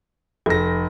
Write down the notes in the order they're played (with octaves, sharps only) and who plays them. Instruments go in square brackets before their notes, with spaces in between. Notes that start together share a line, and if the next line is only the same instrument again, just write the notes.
[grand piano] F1 A#6 [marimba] A4